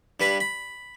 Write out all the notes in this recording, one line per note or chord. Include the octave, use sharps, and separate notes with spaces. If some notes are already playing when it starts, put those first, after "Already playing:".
G2 G3 B4 B5
B5